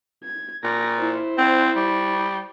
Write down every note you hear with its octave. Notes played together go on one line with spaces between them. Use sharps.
G#6
A#2 A#6
E4 C5
C4
G3